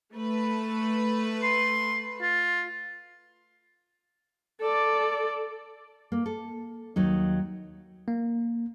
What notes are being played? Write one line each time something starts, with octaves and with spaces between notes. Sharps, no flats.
A3 B4
C6
F4
A4 D5
A#3
A4
D#2 F#3 D#4
A#3